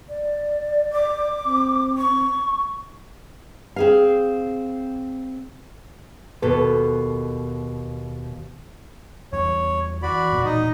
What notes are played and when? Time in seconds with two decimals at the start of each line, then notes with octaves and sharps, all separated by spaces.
0.09 D5
0.93 D6
1.45 C4
1.98 C#6
3.76 C4 G#4 F5
6.42 D#2 B2 A4 B4
9.33 E2 G3 C#5
10.02 E3 F#4 D5 B5
10.32 E1 A#2
10.45 D#4 D#5